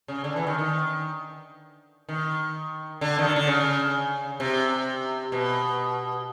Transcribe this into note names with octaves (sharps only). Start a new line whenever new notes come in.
C#3
D3
E3
D#3
D#3
D#3
D3
D#3
D3
D3
C#3
C3
B2